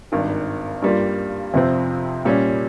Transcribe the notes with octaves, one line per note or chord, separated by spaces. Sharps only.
G#1 G2 D#3
G2 G3 A#3 F4
F2 C3 F3 C4 F4
A#2 G3 C#4